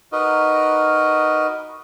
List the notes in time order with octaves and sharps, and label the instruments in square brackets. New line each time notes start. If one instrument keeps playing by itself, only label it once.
[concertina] D#4 F#4 A#4 B4 D#5